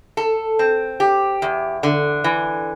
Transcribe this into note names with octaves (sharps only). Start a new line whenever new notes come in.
A4
C4
G4
E2
D3
E3